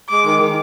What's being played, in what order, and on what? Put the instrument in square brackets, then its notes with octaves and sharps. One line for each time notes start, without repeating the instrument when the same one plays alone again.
[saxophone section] G#3 [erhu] D6
[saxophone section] D#3
D#3